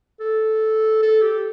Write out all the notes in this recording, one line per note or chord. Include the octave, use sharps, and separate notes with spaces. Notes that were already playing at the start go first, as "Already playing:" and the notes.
A4
A4
G4